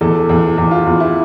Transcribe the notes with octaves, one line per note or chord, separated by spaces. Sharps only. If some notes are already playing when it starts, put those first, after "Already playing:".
E2 A4
E2
E2
F4
E2
E4